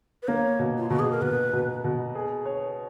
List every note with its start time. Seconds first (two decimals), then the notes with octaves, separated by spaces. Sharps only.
0.23 B4
0.28 A#3 C#5
0.59 B2
0.78 F4
0.89 B2 F#4
0.99 G#4
1.11 A#4
1.22 B2 B4
1.53 B2
1.84 B2
2.15 G#4
2.46 C#5